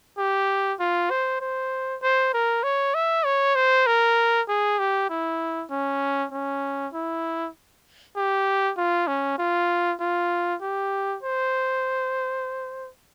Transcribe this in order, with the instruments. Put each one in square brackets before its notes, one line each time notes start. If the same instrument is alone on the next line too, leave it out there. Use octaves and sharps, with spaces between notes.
[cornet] G4
F4
C5
C5
C5
A#4
C#5
E5
C#5
C5
A#4
G#4
G4
E4
C#4
C#4
E4
G4
F4
C#4
F4
F4
G4
C5